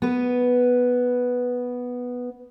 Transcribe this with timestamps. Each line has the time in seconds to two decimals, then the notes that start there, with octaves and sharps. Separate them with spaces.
0.02 B3 B4